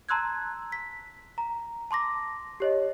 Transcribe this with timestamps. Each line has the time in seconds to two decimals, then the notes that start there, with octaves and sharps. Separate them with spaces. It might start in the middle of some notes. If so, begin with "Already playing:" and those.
0.09 A5 A#5 C6 E6 F#6 G#6
0.72 B6
1.38 A#5
1.91 A5 C6 D6 A#6
2.60 G4 C#5 D#5